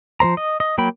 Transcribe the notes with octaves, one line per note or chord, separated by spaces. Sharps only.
F3 A#3 C5 A#5
D#5
D#5
F#3 A#3 G5 B5